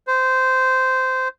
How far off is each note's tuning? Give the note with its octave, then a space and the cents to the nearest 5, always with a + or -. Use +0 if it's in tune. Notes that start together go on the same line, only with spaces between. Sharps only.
C5 -15